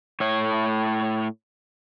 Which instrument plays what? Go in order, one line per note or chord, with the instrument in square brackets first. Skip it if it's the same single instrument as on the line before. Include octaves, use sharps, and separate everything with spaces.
[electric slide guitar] A2 C#5